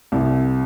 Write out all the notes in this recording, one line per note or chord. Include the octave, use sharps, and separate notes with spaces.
C2